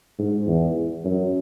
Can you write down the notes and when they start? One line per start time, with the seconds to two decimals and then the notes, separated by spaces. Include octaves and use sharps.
0.19 G#2
0.47 E2
1.05 F#2